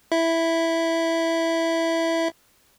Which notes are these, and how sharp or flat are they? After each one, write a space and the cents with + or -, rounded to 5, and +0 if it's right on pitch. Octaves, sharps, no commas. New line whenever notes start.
E4 +0 E5 +0